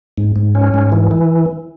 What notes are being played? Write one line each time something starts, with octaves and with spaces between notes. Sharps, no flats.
G#2
G#2
C#4
G#2
E3
E3